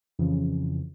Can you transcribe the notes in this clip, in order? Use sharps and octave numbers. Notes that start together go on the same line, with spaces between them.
F2 C#3 E3 F3